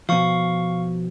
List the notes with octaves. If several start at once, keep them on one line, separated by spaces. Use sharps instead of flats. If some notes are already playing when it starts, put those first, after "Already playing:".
B2 F3 F5 C#6